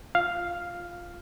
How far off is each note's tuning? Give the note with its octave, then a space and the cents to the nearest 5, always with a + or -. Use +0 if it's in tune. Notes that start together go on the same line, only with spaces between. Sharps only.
F4 +0 F5 +0